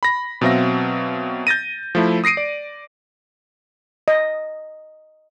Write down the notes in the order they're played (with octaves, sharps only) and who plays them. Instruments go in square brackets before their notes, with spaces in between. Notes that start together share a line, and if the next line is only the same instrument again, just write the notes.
[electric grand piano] B5 A#6
B2 F#3 C4 E5 F5 A#6
G6 A6 A#6 D#7
F3 A3 E4
D#6 A#6 C7 D7 D#7
D5
[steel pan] D#5